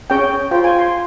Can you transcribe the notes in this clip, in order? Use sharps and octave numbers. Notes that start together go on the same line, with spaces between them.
C#4 G#4 C#5 G5
F4 C5 G5
G#5
C6